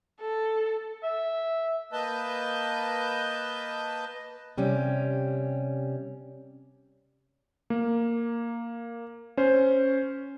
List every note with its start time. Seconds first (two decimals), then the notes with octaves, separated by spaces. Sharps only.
0.21 A4
1.03 E5
1.92 A#3 B4 D#5 A5 G6
4.58 C3 G3 C#4
7.70 A#3
9.37 C#4 C5